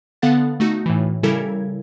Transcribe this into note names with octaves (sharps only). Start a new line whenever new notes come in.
D3 B3 A4 F5 F#5 A6
A3 D#4 F#4
A2 E3
C#3 G3 E4 A4 A#4 G#6